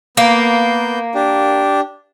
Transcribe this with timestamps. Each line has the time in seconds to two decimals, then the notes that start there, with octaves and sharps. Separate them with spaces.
0.17 A#3 B3 G6
1.15 D4 G4